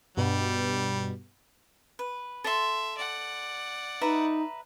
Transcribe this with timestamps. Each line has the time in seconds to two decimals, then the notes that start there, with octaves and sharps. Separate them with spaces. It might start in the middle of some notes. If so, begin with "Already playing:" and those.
0.17 G2 B2 G3 B3
1.99 B4
2.44 A4 E5 C6
2.97 D5 F#5
4.01 D#4 B4 E5 A#5